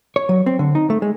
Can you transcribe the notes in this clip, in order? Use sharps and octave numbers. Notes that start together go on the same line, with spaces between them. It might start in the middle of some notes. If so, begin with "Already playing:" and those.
C#5
F#3
C4
D3
D#4
A3
G#3